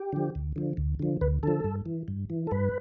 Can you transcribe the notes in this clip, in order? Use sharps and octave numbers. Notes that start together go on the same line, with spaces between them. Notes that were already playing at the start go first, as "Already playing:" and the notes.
Already playing: G4
D3 F3
D2
D3 F3
D2
D3 F3
D2 B4
D3 F3 A4
G2
E3
G2
E3
A4
G2 B4